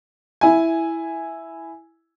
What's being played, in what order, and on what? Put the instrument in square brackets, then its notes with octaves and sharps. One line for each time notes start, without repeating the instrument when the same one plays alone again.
[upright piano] E4 G#5